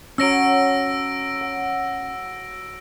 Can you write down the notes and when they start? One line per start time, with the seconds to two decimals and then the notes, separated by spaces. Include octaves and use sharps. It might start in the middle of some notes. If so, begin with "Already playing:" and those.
0.18 F#3 C#4 C#5 A5 E6 A#6 D7
1.41 F#5